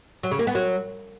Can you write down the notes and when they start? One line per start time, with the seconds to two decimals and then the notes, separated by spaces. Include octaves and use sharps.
0.23 F#3
0.31 C#3
0.39 A#3
0.47 B3
0.55 F#3